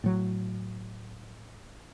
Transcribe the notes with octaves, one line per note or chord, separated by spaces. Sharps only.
A2 F#3